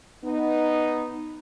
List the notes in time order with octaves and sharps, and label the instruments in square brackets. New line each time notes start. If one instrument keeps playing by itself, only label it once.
[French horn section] B3 D#4